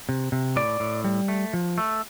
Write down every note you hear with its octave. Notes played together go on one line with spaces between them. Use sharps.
C3
C3
A2 D5
A2
G3
A3
F3
A3